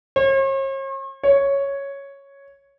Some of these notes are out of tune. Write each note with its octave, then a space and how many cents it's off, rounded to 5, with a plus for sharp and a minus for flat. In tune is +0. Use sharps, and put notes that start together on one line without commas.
C#5 -45
C#5 +0